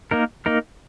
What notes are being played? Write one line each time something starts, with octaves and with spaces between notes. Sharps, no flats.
A#3 D#4 A#4
A#3 D#4 A#4